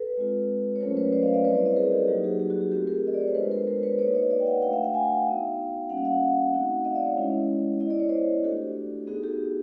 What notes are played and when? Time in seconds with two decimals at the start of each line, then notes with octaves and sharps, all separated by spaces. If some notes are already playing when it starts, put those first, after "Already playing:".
Already playing: A4 B4
0.17 G#3 C4 F4
0.76 C#5
0.80 F#3 A3 C#4 F4 A#4 C5
0.97 B4 C#5
1.12 C5 D5
1.23 D#5 F5
1.34 D5 E5
1.44 G3 C4 E4 B4 C#5
1.55 C5 D5
1.66 C#5 D#5
1.76 G#4 A#4
1.92 G4 A4
2.08 F#3 A#3 D#4 F#4 G4 A4
2.24 F#4 G#4
2.40 G4
2.50 F#4
2.61 G4
2.72 A3 C4 F4 G4 A4
2.87 G#4 A#4
3.07 D#5
3.14 D5
3.20 C#5
3.28 C5
3.35 G#3 B3 D4 F4 A4 B4
3.51 A#4 C5
3.67 A#4 C5
3.83 B4 C#5
3.99 A#3 D#4 F#4 B4 C#5
4.15 C#5 D#5
4.31 D5 E5
4.40 G5
4.46 E5 F#5
4.62 A3 D4 F#4 F5 G5
4.73 E5 F#5
4.84 E5 F#5
4.94 F#5 G#5
5.10 F5 G5
5.26 B3 D#4 F#4
5.89 G3 A#3 C#4 F#4 F#5
5.97 F5
6.05 E5 F#5
6.53 A3 C4 D#4 F#4
6.85 D#5 F5
6.95 D5 E5
7.06 C#5 D#5
7.17 G#3 C#4 E4
7.80 B3 E4 D#5
7.90 D5
8.00 C#5
8.09 C5 D5
8.44 A3 D4 F#4 G4 A4
9.07 B3 D#4 F#4 G#4
9.23 G4 A4